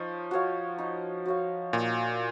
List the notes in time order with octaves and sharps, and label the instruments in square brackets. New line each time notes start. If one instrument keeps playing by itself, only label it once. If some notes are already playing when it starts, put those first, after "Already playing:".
Already playing: [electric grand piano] F3 [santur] D#4 C#5 F5
[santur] F#4 C#5 F5
D#4
F#4 C#5 F5
[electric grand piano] A#2 [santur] D#4